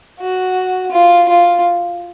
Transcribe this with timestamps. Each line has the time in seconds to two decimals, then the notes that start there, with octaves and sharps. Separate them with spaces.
0.20 F#4
0.91 F4
1.28 F4